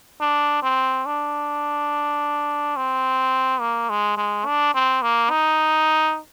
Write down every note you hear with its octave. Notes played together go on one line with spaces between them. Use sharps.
D4
C4
D4
C4
A#3
G#3
G#3
D4
C4
A#3
D#4